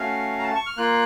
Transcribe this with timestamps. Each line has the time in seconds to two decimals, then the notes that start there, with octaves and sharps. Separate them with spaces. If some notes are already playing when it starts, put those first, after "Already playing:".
Already playing: A3 C#4 F#4 F5
0.39 A#5
0.44 A5
0.55 C#6
0.66 F6
0.77 A#3 F4 F#6